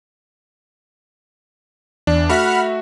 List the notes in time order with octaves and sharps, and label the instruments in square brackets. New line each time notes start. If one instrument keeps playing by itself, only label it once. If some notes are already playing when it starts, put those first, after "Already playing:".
[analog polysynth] E2 [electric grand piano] D4
[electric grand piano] A3 F#4 E5 [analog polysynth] F#5 B5 F6